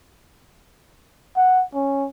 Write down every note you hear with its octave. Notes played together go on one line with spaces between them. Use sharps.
F#5
C#4